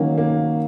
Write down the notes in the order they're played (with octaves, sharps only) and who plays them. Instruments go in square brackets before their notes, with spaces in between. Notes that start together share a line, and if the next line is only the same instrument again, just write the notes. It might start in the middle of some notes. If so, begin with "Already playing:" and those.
Already playing: [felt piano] D#3 F#3 C#4 F#4 [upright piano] A#3
[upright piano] A#3